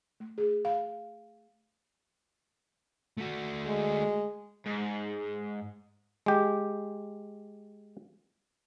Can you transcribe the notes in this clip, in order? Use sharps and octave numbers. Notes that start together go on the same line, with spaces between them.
A3
G#4
F5
A3 F#4
G#3
G#2
G#3 G4